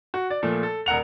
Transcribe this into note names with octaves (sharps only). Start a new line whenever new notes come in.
F#4
D5
A#2 F3 A3
A4
D#1 A#4 F#5 F7